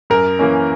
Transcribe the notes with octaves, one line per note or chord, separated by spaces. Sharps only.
F#2 A#4
E3 A#3 C#4